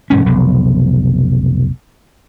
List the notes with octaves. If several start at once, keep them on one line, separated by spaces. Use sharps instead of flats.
E1 G#2 C#4
F1 B1